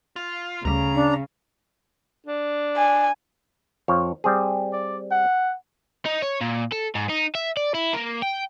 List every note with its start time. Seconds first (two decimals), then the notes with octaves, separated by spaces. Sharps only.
0.16 F4
0.65 D2 C#3 G3 A#5
0.94 D4
2.26 D4
2.77 G#5
3.88 F2 F3 C#5
4.24 G3 C4 G#4
4.73 D5
5.11 F#5
6.06 D#4
6.22 C#5
6.41 A#2
6.72 A4
6.95 G#2
7.09 D#4
7.35 E5
7.57 D5
7.74 E4
7.93 A#3
8.22 G5